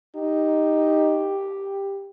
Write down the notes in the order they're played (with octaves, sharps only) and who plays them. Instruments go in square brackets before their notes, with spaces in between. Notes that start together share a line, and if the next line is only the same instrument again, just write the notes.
[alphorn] D#4 [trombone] G4